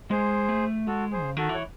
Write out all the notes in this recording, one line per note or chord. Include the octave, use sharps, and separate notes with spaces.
G#3 G#4 C5
A3
G#3 F#4 A4
G#4 C5
C#3
D#3 F#4 A4
E3
C#5